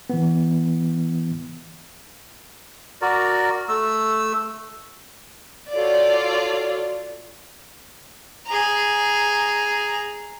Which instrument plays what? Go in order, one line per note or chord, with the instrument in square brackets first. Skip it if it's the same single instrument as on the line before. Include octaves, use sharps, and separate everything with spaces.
[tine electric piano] E3 B3
[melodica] F#4 A#4 D5
A3 E6
[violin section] F4 D5 [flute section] F#4 A4 C#5
[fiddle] G#4 A#5